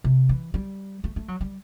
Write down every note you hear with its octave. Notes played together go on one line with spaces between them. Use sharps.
C3
E3
G3
A3
A3
F#3
G3